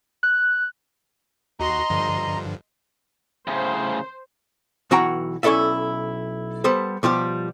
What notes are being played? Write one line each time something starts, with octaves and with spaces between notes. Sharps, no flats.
F#6
D#2 F#4 D#5 A#5 C6 C7
G2 D3 F3
A2 C#3 C5
B1 E3 F#4 F#5 G5 A#5
B1 C#4 E4 A4 D5 E5
G3 B3 A4 C5
B2 F3 G3 G4